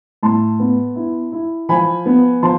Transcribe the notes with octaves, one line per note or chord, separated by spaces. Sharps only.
A2 A5 C6
B3
E4
E4
F3 G#5 B5
B3
F3 A5 C6